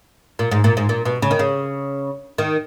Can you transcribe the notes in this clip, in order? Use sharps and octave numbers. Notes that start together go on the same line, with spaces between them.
A#2
G#2
A#2
G#2
A#2
B2
C#3
D#3
C#3
D#3